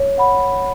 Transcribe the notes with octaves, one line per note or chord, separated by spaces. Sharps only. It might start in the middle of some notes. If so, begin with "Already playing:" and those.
Already playing: C#5
F#5 B5